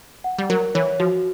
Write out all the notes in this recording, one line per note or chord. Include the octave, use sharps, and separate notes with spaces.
F#5
G3
F#3 A#4
E3 C#5
F3 F#4